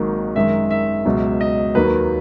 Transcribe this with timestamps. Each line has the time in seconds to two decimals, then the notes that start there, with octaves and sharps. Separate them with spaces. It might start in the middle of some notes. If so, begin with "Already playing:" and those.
Already playing: G#1 G#2 D#3 F#3 A#3
0.36 F#2 D#3 G#3 E5
0.71 E5
1.05 C#2 B2 F#3
1.41 D#5
1.75 D#2 D#3 F#3 A#3 B4